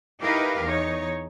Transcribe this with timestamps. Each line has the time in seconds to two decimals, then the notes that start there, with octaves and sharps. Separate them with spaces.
0.21 D#4 E4 G4 A#4 B4 F5
0.61 E2 D#4 C#5